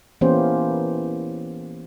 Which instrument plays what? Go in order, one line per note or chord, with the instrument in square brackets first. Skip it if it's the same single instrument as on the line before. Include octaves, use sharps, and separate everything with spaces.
[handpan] E3 A#3 B3 C#4 G4 C5